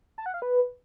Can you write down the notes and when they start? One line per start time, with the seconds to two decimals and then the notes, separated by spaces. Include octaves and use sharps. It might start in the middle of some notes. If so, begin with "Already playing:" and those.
0.18 A5
0.26 F#5
0.34 F5
0.42 B4